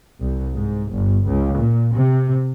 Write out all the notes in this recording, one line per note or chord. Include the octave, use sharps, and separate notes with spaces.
C2
G#2
G1
C#2
A#2
C3